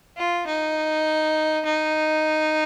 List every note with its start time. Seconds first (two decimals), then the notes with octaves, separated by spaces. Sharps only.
0.17 F4
0.47 D#4
1.65 D#4